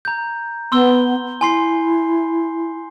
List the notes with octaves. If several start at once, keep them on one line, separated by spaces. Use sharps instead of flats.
A#5 G6
B3 C6 E6 G7
E4 G#5 C6 C7